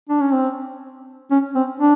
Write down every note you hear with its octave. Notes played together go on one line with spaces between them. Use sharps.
D4
C#4
C4
C#4
C4
D4